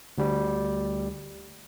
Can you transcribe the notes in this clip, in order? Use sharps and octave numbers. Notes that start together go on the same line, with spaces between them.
D2 G3